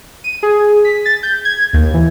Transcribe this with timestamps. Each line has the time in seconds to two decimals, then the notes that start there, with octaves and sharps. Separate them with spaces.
0.24 D#7
0.43 G#4
0.85 B6
1.05 A6
1.23 G6
1.45 G#6
1.73 D#2
1.94 E3